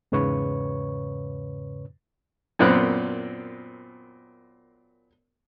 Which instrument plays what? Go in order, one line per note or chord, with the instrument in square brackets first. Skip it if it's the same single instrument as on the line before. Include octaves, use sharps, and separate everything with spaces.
[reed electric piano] E2 G#2 C#3 B4 C#5 C#6
[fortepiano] F#2 A#2 B3 C4 F#6